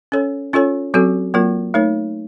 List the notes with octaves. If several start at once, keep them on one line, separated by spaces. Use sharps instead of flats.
C#4 A4 C#5
C#4 F4 A4 C#5
F#3 C4 F#4 A4
F#3 A#3 F4 A#4
A3 D#4 A#4 C#5